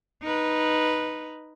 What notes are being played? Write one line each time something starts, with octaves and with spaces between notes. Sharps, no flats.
D#4 B4